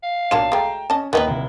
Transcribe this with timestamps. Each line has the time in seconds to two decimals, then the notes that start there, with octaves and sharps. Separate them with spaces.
0.03 F5
0.31 B1 A#3 D4 F4 A5 E7
0.52 G#3 A3 G5 A#5
0.90 C#4 D#5 A5
1.13 D#2 D#3 B3 D#4 B4 D#5 G7
1.27 F1 F2 E4